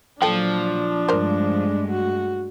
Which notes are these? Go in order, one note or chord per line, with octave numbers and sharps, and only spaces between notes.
A#2 F3 F#3 D4 A4 G5
G2 G#3 A3 A#4 C5
F#4